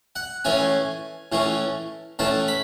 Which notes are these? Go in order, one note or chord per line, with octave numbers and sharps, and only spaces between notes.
F#5
A2 E3 A3 C#4 G#5
A2 E3 A3 C#4
A2 E3 A3 C#4 A5
B5